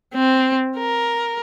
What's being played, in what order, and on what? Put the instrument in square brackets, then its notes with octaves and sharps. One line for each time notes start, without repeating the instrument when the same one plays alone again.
[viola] C4
A#4